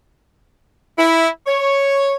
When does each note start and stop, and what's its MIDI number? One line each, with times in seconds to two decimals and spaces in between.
0.97 1.27 64
1.47 2.16 73